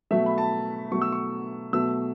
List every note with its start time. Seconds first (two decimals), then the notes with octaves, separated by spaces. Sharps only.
0.11 B2 F#3 A3 E5
0.26 B5
0.38 A5
0.91 B2 F#3 A3 C#6
1.02 E6
1.12 C#6
1.73 B2 F#3 A3 E6